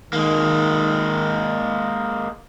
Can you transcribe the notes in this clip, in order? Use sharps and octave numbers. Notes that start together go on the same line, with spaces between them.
D#3 G#3 A#3